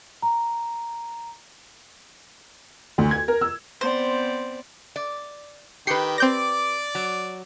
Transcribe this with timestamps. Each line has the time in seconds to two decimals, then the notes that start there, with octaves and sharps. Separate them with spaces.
0.22 A#5
2.98 D2
3.11 G#6
3.28 A#4
3.41 E6
3.81 B3 C4 C5 D5
4.96 D5
5.87 D#3 G4 B4 G5 C7 C#7
6.18 C4 D5 D6 G6 A#6
6.95 F#3